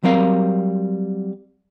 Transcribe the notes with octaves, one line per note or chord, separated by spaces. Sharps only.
F#3 G3 C4 A#4 F5